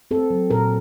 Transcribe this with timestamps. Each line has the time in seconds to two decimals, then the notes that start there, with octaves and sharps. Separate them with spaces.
0.11 C4 A4
0.30 F#3
0.50 A#2 A#4